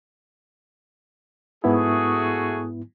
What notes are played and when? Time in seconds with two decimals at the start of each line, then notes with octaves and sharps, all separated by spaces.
1.64 G#2 A3 B3 E4 F#4 G#4